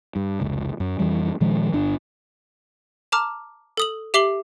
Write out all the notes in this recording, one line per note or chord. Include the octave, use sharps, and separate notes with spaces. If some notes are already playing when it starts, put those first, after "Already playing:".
G2
F1 C#2
F#2
F2 E3 G3
A#2 D#3 F3 G#3
G1 D4
A5 A#5 D6 F6
A4 D#6 F#7
G4 E5 D6 C7 F#7 G7